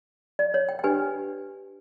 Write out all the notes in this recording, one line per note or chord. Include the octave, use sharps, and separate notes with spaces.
D5
C#5
G5
G5
D4 G4 B4 G#5